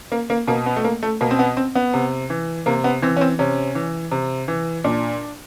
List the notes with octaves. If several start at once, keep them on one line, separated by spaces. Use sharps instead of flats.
A#3
A#3
B2 A#3
B3
A3
A#3
A3
B2 A#3
C4
B3
C4
B3
C3
E3
C3 A#3
B3
E3 C4
C#4
C4
C3 C#4
E3
C3
E3
A#2 D4